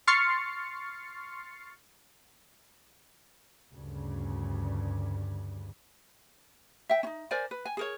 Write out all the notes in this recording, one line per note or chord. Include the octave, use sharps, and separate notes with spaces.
C6 C#6 F6 A6 C7 C#7
D2 G2 C#3
E5 G5
C#4 D#4
A#4 C5 D5 G#5
B4
G#5
G#4 A#4 C#5